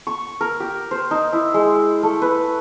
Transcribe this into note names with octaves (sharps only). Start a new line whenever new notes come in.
C#6
A#4
G4
C5
D#4
E4
G#3
A3
B4